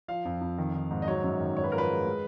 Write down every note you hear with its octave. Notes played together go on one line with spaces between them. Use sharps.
F3 F5
F2
F2
D#3
D#3
G#2
D#5
F#3 C#5
F#2
D#3
G#2 C#5
B4
F3 A#4
B4
G#3
G#3